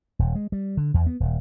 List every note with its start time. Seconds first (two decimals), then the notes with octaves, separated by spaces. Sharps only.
0.19 D#1
0.35 G#3
0.52 G3
0.77 D3
0.94 E2
1.06 B3
1.20 D#1